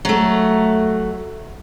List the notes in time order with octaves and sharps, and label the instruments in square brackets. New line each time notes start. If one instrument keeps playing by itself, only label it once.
[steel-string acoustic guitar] F#3 A3